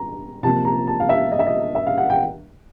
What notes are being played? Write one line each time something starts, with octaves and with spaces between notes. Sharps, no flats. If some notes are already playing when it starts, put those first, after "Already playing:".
Already playing: A#5
C3 F3 A#3 A5
A#5
A5
F5
E5
D#5
E5
D#5
E5
F5
F#5
G5